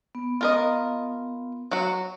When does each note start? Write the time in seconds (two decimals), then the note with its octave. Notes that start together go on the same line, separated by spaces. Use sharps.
0.15 B3
0.41 F4 A#4 D#5
1.71 F#3 F#4